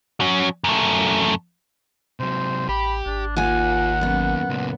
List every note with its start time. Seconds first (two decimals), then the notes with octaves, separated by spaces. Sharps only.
0.20 F#3 C#4
0.64 F#2 A3
2.20 C3 F#3 C5
2.69 A1 G4 B5
3.06 G#1 D4
3.36 D#2 A#3 F4 F#5 G#5
4.01 F#2 B3
4.49 C#2 A#2